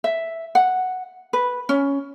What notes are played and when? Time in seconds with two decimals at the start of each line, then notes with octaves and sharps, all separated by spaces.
0.04 E5
0.55 F#5
1.33 B4
1.69 C#4